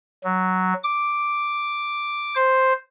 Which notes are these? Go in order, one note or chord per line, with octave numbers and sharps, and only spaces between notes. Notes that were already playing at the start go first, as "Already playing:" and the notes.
F#3
D6
C5